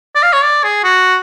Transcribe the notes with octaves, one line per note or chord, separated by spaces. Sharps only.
D5
F5
C#5
D5
G#4
F#4